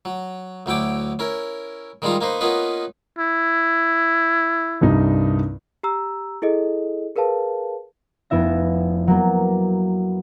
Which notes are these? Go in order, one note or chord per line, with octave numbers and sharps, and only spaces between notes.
F#3
D2 F#3 E4 G5 D6
C#4 E4 A#4
D#3 G3 G#3 D#4 F4 A#5
A#3 D#4 B4 C5
A#3 B3 C#4 D#4 F4 B4
E4
C2 G2 D#4
G4 A#5 E6
E4 G#4 A4 D#5
G#4 A#4 B4 F5 A5
F1 B3 E4 E5 A#6
F#3 A#3 B3